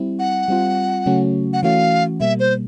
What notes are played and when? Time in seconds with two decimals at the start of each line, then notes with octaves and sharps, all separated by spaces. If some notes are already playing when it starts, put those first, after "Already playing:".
Already playing: G3 C4 E4
0.19 F#5
0.48 G3 C4 F4
1.06 C#3 F#3 A3 C#4 F#4
1.53 F#5
1.63 E3 A3 C#4 F#4 F5
2.20 B2 G3 A#3 E5
2.40 C5